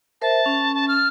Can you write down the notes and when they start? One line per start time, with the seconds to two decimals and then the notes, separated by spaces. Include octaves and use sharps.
0.22 A#4 C5 E5 A5
0.46 C#4
0.75 A5
0.88 F6